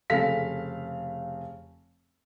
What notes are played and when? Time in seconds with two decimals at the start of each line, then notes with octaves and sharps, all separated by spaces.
0.10 F1 C#3 A4 F5 B6